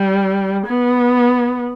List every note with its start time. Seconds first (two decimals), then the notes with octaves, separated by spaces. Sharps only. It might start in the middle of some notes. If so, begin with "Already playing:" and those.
Already playing: G3
0.67 B3